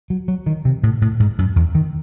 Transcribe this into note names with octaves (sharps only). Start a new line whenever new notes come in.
F#3
F#3
D#3
C3
A2
A2
G#2
F#2
E2
D#3